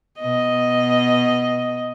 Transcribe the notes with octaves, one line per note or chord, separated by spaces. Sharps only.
B2 D#5